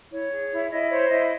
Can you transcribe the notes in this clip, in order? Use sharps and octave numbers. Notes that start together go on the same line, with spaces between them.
E4 C#5
G#4
E4
E4 D#5
C5 C#5
E4 D#5